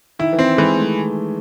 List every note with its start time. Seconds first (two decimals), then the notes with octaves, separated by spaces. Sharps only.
0.19 D#3 E4
0.32 E3
0.39 C4
0.57 E3 G#3
0.76 A3